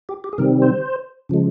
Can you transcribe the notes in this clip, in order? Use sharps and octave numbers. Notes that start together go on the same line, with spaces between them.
G4
G4
G#4
C3 D#3 G3 C4 A#4
C5
C#3 F3 G#3